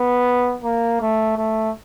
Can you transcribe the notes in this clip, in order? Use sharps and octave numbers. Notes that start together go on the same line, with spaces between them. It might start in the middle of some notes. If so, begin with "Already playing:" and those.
Already playing: B3
A#3
A3
A3